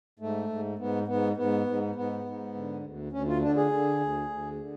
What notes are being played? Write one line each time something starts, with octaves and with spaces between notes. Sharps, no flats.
G#2 A3
G#2
G#2 B3
G#2 B3
G#2 B3
G#2
G#2 B3
G#2
D3
D2
D2 C#4
F4
D3 D4
G#4
D3
D2
D2
D3